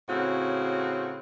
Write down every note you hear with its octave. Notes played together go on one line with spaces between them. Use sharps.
A2 C#3 C4 F#4